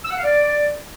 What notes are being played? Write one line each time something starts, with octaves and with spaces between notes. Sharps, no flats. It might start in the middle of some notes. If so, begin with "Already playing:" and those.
E6
F#5
F5
D5